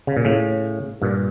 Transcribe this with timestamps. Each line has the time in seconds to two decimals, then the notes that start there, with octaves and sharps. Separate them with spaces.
0.07 C#3
0.17 A#2
0.25 A2 C#3
1.02 G2 A#2